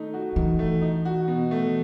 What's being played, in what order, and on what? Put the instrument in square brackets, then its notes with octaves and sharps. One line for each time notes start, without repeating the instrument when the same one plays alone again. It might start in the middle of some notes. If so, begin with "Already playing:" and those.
Already playing: [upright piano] D#3 A3 D#4
F#4
[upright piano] D#3 [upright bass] E3
[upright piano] A3
D#4
F#4
B2
A3